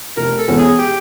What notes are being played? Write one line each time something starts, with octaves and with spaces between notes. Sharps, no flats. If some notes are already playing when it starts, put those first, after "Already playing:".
F1 A#4
A4
E2 B2 G#3 C#4
G#4
G4